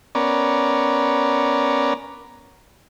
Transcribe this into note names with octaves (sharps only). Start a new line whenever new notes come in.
B3 C#4 A#4 D5